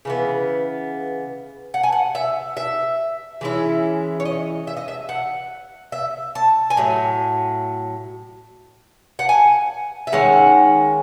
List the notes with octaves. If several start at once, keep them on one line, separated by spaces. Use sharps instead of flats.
C#3 E3 B3
F#5
G#5
F#5
E5
E5
E3 G#3 C#4 E4
C#5
D#5
E5
D#5
E5
F#5
E5
A5
G#5
A2 F#3
F#5
G#5
E5
D#3 G#3 C#4 F#5